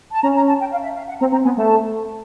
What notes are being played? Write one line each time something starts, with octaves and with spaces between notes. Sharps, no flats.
A5
C#4 A#5
A#5
A5
G5
F5
E5
F5
F#5
C4 A#5
C4 A#5
B3 G#5
A3 A5